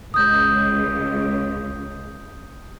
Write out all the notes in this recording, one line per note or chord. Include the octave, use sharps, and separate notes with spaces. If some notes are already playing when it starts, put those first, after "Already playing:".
C#2 D#6 G6